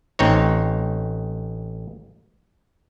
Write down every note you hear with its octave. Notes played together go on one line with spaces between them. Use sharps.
A1 C4 D#4 C#5